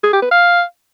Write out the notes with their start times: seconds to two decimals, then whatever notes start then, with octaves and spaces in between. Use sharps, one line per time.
0.04 G#4
0.13 G4
0.22 B4
0.31 F5